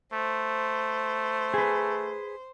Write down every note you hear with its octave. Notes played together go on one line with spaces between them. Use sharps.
A3 C5
G#4 B4